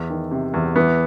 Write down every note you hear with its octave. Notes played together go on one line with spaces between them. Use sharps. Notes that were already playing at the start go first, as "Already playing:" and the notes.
Already playing: E2
D#3
C3
E2
E3 B3